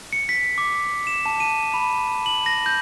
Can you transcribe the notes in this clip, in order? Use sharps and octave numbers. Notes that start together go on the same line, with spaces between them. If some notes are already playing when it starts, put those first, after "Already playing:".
C#7
B6
D6
E7
A5
D#7
B5
F#7
A#6
G6